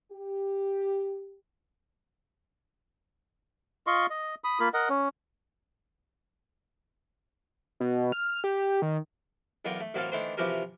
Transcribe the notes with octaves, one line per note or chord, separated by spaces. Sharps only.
G4
F4 D#5 C6 C#6
D#5
B5 D#6
A#3 F4 B5
A#4 D#5 F#5
C#4
B2
F6
G4
D#3
B1 E2 F4 A#4 F#5 G5
A3
A1 F#3 A#3 C4 A4 F5
D#3 E3 A3 D4 C5
C3 E3 F3 F#4 G4 A#4